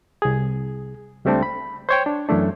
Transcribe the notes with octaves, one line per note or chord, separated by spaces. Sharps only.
C2 G#4
C#2 G3 A3 C4 D4 A4
B5
C5 C#5 G5
D4
F#2 E3 A3 D4